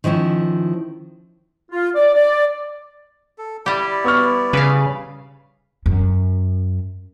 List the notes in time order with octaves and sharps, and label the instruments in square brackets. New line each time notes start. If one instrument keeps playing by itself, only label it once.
[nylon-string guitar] D#3 F3 C#4 E4
[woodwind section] F4
D5
D5
[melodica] A4
[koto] G3 G4 [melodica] E4 D5
[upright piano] B3 C#6 F6
[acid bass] C#3 [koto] B4 F5
[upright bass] F#2